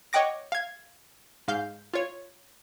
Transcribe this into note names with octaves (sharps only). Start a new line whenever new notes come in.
C#5 D#5 F#5 G5 D6 A#6
F5 G#6
G#2 F5 G6
F4 C#5